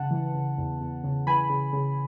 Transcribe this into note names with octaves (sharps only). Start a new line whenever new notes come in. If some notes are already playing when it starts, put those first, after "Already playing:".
Already playing: C#3 F#5 A5
E3
C#3
E2
E2
C#3
E3 G#5 B5
C#3
C#3